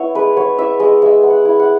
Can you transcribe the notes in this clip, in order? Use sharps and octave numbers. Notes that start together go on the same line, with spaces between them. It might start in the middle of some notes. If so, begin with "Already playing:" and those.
Already playing: B3 E4 C#5
G#3 B4
B3 C#5
E4 E5
G#3 D#5
G#3 E5
B3
F#5
E4
F#5